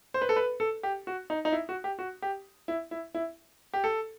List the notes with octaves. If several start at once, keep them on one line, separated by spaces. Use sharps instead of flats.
C5
B4
A4
B4
A4
G4
F#4
D#4
D#4
E4
F#4
G4
F#4
G4
E4
E4
E4
G4
A4